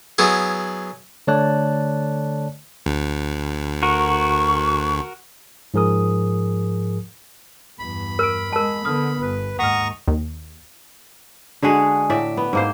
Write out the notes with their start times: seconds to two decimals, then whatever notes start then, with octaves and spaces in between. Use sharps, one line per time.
0.18 F#3 B3 E4 G#4
1.27 D3 A3 C#5 D5 A5 F#6
2.86 D2
3.83 F#4 A#4 C#6
5.74 G#2 F3 G#4 A#4 D#6
7.79 E2 G2 B5
8.19 A#4 F6 D7
8.53 G#3 A#4 A5
8.85 D3 B3 D#6 F6
9.21 G1 B4
9.59 D#2 G#2 F#5 A#5 C#6 D#6 F6
10.08 D#2
11.62 D3 G#3 F#4 G#4
12.10 A2 D5 E5
12.37 B3
12.53 G#2 A#3 C5